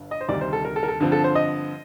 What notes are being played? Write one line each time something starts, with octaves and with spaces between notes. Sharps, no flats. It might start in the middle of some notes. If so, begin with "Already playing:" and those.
Already playing: G1 G2
D#5
C5
D2 C3 D#3 G3 D5
C5
A4
A#4
A4
A#4
A4
G2 D3 F3 C4
A4
C5
D#5